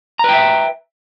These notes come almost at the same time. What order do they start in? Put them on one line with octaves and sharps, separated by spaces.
A#5 B4 G5 E5